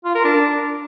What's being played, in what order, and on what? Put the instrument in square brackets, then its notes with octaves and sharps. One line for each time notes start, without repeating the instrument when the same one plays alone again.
[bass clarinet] F4
A#4
D4